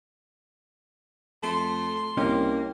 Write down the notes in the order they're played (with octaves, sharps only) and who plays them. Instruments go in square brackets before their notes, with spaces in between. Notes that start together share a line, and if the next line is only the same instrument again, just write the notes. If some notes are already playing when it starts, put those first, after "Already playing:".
[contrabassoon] F2 [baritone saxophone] A3 [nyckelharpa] C6
[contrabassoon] C2 [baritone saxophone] A#3 [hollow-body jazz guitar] C#4 D#4 G4